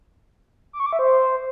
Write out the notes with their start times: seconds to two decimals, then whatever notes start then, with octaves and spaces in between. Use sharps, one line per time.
0.73 D6
0.80 C#6
0.86 D6
0.93 E5
0.99 C5